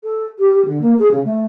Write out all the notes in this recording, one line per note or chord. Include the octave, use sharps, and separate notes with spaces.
A4
G4
G4
D3
A#3
G#4
C#3
A3